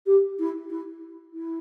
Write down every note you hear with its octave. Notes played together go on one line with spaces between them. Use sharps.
G4
E4
E4
E4